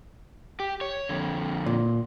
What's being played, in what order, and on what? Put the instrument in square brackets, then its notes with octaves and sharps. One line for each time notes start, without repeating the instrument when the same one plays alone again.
[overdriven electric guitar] G4
C#5
F2 D3
[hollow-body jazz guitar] A#2